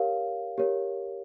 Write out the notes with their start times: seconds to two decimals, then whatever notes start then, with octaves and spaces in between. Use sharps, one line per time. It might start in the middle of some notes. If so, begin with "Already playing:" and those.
Already playing: G4 A#4 C#5 F5
0.58 G4 A#4 C#5